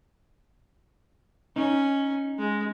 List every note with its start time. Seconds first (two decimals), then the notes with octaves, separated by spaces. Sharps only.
1.56 C#4 D#4
2.39 G#3